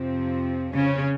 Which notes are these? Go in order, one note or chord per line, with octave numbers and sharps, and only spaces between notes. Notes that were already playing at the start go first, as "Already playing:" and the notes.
Already playing: F2 C3 F3 C4
C#3 C#4